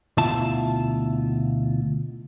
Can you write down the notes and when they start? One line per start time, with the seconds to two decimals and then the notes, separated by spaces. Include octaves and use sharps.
0.17 D2 B2 E4 F4 E5 A5